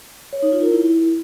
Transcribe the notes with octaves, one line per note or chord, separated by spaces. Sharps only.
C#5
D#4
F4
A#4
E4